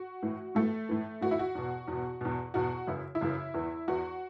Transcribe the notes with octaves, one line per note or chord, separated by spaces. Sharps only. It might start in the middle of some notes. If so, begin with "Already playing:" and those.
Already playing: F#4
A2 E3
A2 E3 A3 A4
A2 E3
A2 E3 F#4
E4
F#4
E2 B2
E2 B2
E2 B2
E2 B2 F#4
F#2 C#3 E3 E4
E4
F#2 C#3 E3
E2 E3
E2 E3 F#4